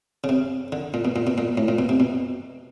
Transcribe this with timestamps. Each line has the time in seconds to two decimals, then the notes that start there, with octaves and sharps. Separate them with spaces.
0.24 C#3
0.29 C3
0.72 D3
0.94 A#2
1.05 B2
1.16 A#2
1.27 B2
1.38 A#2
1.57 A2
1.68 A#2
1.79 B2
1.89 C3
2.00 B2